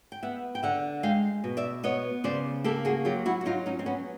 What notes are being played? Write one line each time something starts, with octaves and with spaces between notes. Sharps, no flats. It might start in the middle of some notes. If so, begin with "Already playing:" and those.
G5
B3 E5 F#5
G5
D3 E5 F#5
G#3 F5 G5
B2
D5 E5
B3 C#5 D#5
C#3 C5 D5
A#3 G4 A4
F#4 G#4
F#3 F4 G4
E4 F#4
F#4
F#3 D#4 F4
C#4 D#4
C4
F#3 B3 C#4